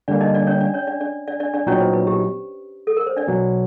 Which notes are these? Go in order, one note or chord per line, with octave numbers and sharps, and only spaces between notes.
D3 G3 A#3 D4 D5
D#4 D#5
D4 D5
C#4 C#5
D4 D5
C#4 C#5
D4 D5
D4 D5
D4 D5
D4 D5
D4 D5
A#2 F#3 B3 C#4 D#4 F#4 C#5
C5
B4
G4
A4
A#4
C5
D4 D5
B2 F#3 B3